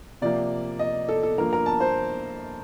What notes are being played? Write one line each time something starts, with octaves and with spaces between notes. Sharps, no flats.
C3 F3 A#3 D5
D#5
A4
A4
G2 F3 A#3 A#4
A#4
A5
C5